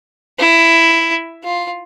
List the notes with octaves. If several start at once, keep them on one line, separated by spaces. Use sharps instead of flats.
E4
F4